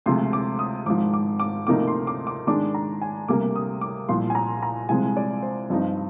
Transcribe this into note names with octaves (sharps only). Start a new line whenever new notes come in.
D2 C3 F3 G#3 C6
D6
D#6
G#1 G#2 F3 D6
D6
D6
D2 C3 F3 A#3 D#4 D6
C6
D6
D6
G#2 D#3 G#3 D4 D6
A#5
G#5
D2 C3 G3 A#3 D6
D#6
D6
C2 A#2 F3 C6
G#5
A#5
A#5
C2 C3 F3 G#3 C4 G#5
D5
C5
G2 F3 C4 D#4